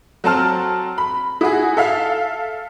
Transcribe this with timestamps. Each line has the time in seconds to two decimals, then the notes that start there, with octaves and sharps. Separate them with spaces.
0.24 F#3 C4 A5 F6
0.98 B5
1.41 E4 F#4 G#4
1.77 A4 E5 F5